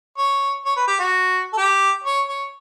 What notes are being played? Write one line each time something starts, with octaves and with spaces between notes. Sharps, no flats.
C#5
C#5
B4
G4
F#4
A4
G4
C#5
C#5